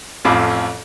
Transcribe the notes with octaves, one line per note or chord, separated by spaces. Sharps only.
A1 F2 F4 B5 D6